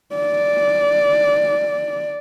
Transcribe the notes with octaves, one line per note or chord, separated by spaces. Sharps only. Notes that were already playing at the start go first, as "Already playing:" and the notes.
D5